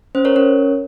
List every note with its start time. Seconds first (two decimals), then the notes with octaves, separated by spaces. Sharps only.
0.15 C#4 C5
0.25 A#4 C#5
0.36 C#4 A#4 C#5